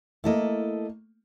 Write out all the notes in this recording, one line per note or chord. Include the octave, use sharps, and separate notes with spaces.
A3 A#3 E4 A4 D#5